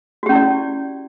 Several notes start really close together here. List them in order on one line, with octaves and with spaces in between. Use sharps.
F#4 G4 C#4 E4 D5